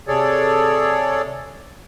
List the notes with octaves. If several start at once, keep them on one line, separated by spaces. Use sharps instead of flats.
C3 G#4 A4 C#5 D5